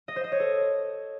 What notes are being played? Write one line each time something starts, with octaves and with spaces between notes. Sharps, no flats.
D#5
C5
D#5
C#5
A4